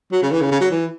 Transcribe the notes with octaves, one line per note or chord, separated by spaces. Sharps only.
F#3
C#3
E3
C#3
C#3
F#3
E3